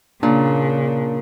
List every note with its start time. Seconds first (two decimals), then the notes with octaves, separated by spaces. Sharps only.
0.23 A#2 C#3 D4